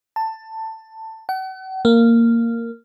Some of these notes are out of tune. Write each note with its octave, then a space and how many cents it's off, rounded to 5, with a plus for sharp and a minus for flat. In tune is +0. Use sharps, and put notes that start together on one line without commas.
A5 +15
F#5 +40
A#3 -10